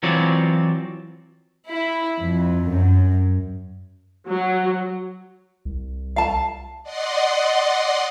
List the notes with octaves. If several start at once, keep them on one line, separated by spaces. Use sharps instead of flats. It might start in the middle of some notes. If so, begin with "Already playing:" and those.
E3 F#3 C4 F4 C#5 D5
E4
F2
F#2
F#3
C2
F5 A5
D5 D#5 F#5 C6